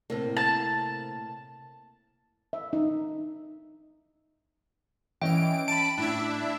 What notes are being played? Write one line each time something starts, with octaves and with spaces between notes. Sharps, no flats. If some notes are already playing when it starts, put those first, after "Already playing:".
A2 C3 A#3
A5
E5
D#4
E3 C#4 D#5 E5 G5 D7
A5 B5 D7
A2 D4 E4 E5